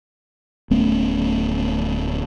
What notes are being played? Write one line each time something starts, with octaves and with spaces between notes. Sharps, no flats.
D1 A3 B3 C#4